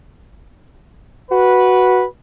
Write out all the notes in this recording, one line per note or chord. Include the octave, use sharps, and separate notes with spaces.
F#4 B4